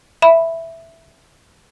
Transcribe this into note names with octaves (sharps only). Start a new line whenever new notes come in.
E5 B5